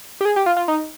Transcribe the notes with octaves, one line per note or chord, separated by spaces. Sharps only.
G4
G#4
G4
F4
F4
D#4